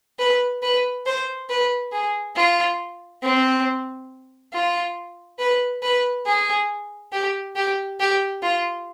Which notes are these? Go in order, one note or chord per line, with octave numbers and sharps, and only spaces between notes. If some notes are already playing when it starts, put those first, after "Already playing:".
B4
B4
C5
B4
G#4
F4
C4
F4
B4
B4
G#4
G4
G4
G4
F4